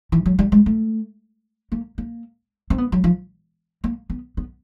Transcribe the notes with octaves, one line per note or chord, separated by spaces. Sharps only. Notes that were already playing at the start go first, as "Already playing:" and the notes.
E3
F#3
G3
G#3
A3
A#3
A#3
C4
B3
F#3
F3
A#3
B3
B3